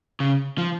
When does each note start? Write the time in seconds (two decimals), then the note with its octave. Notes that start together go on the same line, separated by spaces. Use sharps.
0.20 C#3
0.58 F3